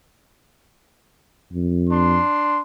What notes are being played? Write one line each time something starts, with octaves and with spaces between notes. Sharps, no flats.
F2
D4 C6